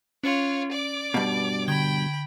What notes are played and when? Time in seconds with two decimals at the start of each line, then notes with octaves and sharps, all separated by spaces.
0.24 C#4 F4 C#5 C#7 F#7
0.72 D5 D6
1.14 G2 B2
1.68 D3 G5 B5 G#6 G7